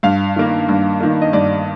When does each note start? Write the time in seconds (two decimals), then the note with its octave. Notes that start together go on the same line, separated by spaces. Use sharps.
0.03 G2 F5
0.36 D#3 A#3
0.69 G2
1.01 D#3 A#3
1.22 D#5
1.33 G2 D5